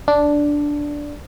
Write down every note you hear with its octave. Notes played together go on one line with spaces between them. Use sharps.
D4